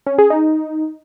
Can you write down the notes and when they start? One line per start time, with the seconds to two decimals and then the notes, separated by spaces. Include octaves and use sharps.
0.07 C#4
0.18 G#4
0.30 D#4